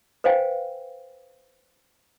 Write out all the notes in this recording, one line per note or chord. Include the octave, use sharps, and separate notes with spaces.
B4 C5 F5 G5 G#5